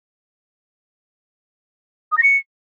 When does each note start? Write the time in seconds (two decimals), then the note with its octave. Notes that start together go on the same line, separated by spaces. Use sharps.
2.12 D#6
2.17 A#6
2.23 C#7